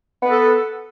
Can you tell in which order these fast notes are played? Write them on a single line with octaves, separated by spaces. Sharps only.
B3 B4 A4